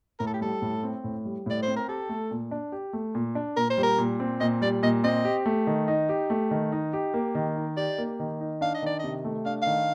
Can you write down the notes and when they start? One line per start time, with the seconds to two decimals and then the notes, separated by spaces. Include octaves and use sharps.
0.20 A2 A#4
0.27 A4
0.34 G4
0.41 G3 A4
0.62 A2
0.83 C4
1.04 A2
1.25 G3
1.46 A2 D5
1.63 C4 C5
1.76 A#4
1.88 G4 A4
2.09 A3
2.31 A#2
2.51 D4
2.72 G4
2.93 A3
3.15 A#2
3.35 D4
3.57 A#2 A#4
3.70 C5
3.78 G3
3.83 A#4
3.98 A#2
4.20 C4
4.40 A#2 D#5
4.61 G3 D5
4.83 A#2 D#5
5.04 C4 D#5
5.25 G4
5.46 A3
5.67 D#3
5.88 D#4
6.09 G4
6.30 A3
6.51 D#3
6.72 D#4
6.93 G4
7.14 A#3
7.35 D#3
7.56 D#4
7.77 G4 D5
7.98 A#3
8.19 D#3
8.41 D#4
8.61 D4 F5
8.74 D#5
8.82 D#3 D5
8.99 C3 D#5
9.25 A3
9.46 D4 F5
9.62 D#3 F5